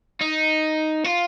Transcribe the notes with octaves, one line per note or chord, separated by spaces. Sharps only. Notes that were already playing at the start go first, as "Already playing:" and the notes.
D#4
F4